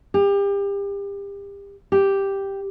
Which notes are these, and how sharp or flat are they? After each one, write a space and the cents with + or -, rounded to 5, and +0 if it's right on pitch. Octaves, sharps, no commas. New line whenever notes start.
G4 +30
G4 +0